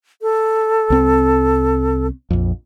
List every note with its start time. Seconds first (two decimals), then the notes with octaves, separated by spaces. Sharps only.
0.22 A4
0.90 C2 C4
2.30 A#1 F2